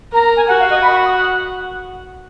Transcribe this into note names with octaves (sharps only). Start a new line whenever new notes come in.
A#4 A#5
A#5
G#5
F#4 F#5
F5
D#5
B5
C#6
D#6
F#5